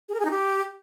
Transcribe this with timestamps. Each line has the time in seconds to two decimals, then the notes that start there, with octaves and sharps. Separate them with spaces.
0.09 G#4
0.14 A#4
0.20 G#4
0.25 D#4
0.30 G4